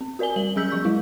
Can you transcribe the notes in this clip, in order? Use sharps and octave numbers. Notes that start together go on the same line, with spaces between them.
C4
F#4 A#4 D5 G#5 G7
G3 F#7
F#3 C#4 G#4 E6 G6 B6
F3 C#6 G6
F#3 G#3 E4